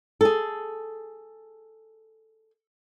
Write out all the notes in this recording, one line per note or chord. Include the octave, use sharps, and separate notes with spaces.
G#4 A4